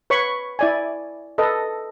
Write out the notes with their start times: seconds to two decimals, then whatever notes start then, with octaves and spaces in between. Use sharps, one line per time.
0.10 B4 C#5 B5 C#6
0.59 E4 D5 G#5
1.38 A4 B4 D#5